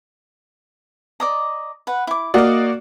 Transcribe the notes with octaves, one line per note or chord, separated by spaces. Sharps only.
D5 D#5 A#5
B4 F#5
E4 D6
A#3 F#4 D5 D#5 F5